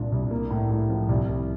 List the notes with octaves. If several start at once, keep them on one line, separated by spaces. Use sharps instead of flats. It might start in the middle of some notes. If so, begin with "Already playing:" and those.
Already playing: C2 A#2 D4
C2
A#3
A2
A2
F3
C2
C2